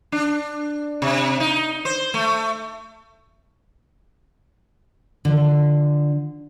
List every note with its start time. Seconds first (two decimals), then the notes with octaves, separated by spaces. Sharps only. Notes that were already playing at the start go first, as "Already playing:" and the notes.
0.12 D4
1.02 C3
1.40 D#4
1.85 C5
2.14 A3
5.25 D3 F3